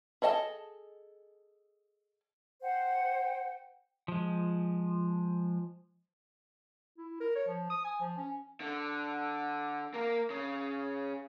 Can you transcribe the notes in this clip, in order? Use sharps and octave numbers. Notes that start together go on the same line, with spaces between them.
G#4 A4 D#5 F5 A5
C5 F#5 G5
F3 G#3
E4
A#4
C#5
F3
D#6
G#5
F3
C#4
D3
A#3 A#4
C#3